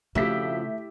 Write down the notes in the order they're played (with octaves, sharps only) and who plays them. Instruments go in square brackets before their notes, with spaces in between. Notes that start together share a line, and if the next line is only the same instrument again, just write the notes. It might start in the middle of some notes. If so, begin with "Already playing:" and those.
[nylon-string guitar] F2 F3 F#4 [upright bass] C#3 [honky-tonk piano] A3 B6 [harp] E4 G4